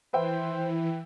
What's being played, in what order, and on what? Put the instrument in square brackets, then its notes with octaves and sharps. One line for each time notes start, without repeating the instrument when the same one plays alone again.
[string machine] E3 [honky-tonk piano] B4 E5 G5 [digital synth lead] C5